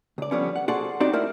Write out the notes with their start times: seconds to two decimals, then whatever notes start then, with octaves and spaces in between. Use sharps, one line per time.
0.18 C#2 D5
0.31 D3 F3 G3 B3 C#4
0.56 F#5
0.68 F#4 G#4 A4 C5 D5 F#5
1.00 C4 D4 D#4 F#4 G4 D5
1.13 A3 E4 A#4 C5 D5